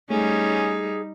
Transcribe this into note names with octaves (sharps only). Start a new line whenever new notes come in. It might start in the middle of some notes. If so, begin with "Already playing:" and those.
G3 A3 C#4 D#4 G#4